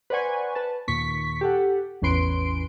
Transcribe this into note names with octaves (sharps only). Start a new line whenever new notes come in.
B4 C5 D5 F#5 G#5 C#6
B4 A5
D#2 A#2 C#6 B6
G4 A4 F#5
A1 E2 C#4 B4 C6 D7